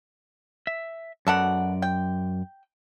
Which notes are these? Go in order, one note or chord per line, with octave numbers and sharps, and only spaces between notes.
E5
F#2 B2 A4 D5 F#5
G5